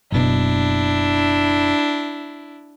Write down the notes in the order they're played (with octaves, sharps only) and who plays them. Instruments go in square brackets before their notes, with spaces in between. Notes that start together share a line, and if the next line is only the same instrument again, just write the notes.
[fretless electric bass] F#1 B2 [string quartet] D4 E4